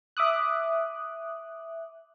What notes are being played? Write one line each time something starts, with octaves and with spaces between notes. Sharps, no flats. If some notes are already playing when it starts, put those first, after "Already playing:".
E5 D6 D#6 F#6